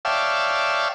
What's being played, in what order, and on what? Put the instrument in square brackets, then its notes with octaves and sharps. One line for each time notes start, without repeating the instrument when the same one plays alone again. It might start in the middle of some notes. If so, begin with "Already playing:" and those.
[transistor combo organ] C#5 D5 E5 F5 G5 A5